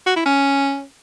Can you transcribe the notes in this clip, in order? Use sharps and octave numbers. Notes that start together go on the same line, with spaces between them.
F#4
E4
C#4